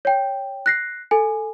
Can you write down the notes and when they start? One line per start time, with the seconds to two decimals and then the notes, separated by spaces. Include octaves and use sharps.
0.05 C#5 G5
0.66 F#6 A#6 C7
1.11 A4 G#5